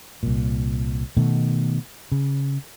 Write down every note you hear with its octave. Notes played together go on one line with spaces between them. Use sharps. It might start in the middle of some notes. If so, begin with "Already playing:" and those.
C2 A#2
B2 D#3 A3
C#3